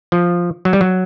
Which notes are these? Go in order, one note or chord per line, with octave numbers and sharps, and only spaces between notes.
F3
F#3
G3
F#3